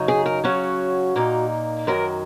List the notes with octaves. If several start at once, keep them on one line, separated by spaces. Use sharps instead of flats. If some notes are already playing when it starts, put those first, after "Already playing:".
Already playing: F#2 C#3 F#3 D#4
G#4
A#4
C#3 F#3 C#4 F#4
A#2 A#3 D#4
F#2 D#3 F#3 A#4